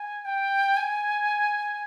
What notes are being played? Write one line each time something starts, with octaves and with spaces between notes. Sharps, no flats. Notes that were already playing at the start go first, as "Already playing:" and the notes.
Already playing: G#5
G5
G#5